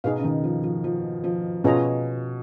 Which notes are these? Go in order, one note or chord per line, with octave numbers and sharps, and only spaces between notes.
B2 D#4 G#4 B4 F5
C#3
D#3
F3
F3
F3
F3
B2 C#4 F4 G#4 D#5 A#5